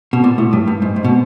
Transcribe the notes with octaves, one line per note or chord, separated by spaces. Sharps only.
B2
A#2
A2
G2
G2
G#2
G#2
B2